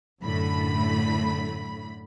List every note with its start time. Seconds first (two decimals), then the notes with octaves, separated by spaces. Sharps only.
0.22 F#2 A2 D3 A3 B5